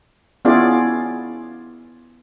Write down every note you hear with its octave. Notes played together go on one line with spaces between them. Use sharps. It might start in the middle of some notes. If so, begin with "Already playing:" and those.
B3 C#4 E4 F4 G#4 D5